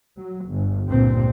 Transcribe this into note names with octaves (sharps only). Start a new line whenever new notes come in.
F#3
G1
C#2 G2 A#2 C4